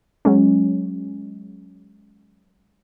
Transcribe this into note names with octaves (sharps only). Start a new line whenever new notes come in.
F#3 G#3 C#4